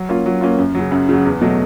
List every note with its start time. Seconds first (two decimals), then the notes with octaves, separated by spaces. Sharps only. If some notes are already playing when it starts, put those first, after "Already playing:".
Already playing: F#3
0.09 A#3 C#4 F4
0.26 F#3
0.41 A#3 C#4 F4
0.58 F#2
0.75 C#3 F#3
0.91 F#2
1.09 C#3 F#3
1.25 E2
1.41 B2 F#3 A3